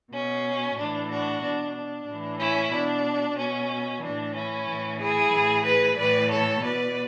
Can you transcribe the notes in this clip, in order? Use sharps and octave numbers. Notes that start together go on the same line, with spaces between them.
B2 C#4
A2 E3 D4
D4 F#4
B2 D4
D4
A2 E3
C#4 E4
B2 D4
B2 C#4
A2 E3 D4
C#4 E4
A2 E3
E4 G#4
A2 E3
G#4 B4
A2 E3 B4 D5
A4 C#5
B2 B4 D5